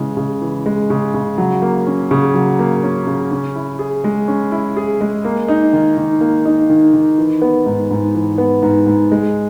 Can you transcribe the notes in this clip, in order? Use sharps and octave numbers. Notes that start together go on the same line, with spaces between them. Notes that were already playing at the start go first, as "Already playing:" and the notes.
Already playing: C#3 E3 G#3
C#3
E3
G#3
C#3
C#3
F#3
A#3
C#4
C#3
F#3
A#3
C#4
C#3
C#4
E4
G#4
G#3
C#4
E4
G#4
G#3
A#3
D#4
D#3
D#3
A#3
D#4
D#3
D#3
E3
B3
G#2
G#2
E3
B3
G#2
G#2
G#3